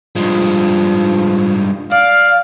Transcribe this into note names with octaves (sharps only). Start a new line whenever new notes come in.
G2 F3 G#3
D5 F5